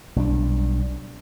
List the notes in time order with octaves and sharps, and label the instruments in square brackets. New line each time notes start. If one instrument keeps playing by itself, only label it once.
[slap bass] B1 G3 C#4 D4